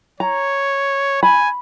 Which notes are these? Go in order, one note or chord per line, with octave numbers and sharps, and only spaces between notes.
C#5 A#5
G#5 B5